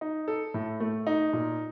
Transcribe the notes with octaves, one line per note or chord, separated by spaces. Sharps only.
D#4
A4
A2
A3
D#4
A#2